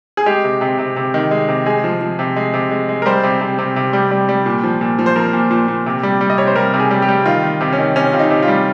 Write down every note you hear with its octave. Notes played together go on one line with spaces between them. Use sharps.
G#4
G#3 G4
C3
C3
C3
C3
D#3
G#3
C3
G#3 G#4
F3
F3
C3
G#3
C3
G#3
G#3
A#4
G3 C5
C3
C3
C3
C3
G3
G3
G3
A#2
F3
A#2
F3
C5
F3 A#4
A#2
A#2
A#2
C3
G3
G3
D#5
C3 C#5
C5
G3 A#4
C3
G#4
G3
G4
G3
D#3 F4
D#3
C3
C#4
D#3
C3 C#4
C3 F4
D#4
C3
F4
G3